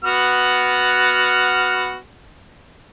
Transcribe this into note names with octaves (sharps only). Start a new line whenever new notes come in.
B3 F#4 F6